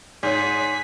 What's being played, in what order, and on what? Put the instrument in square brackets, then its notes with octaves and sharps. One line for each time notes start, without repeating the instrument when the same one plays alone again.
[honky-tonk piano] G#2 [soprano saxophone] G#4 [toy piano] C#5 D5 [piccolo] B6